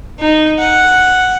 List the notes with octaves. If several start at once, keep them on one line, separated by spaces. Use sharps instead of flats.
D#4
F#5